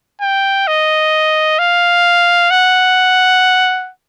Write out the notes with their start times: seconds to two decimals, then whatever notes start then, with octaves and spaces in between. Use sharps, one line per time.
0.21 G5
0.67 D#5
1.59 F5
2.50 F#5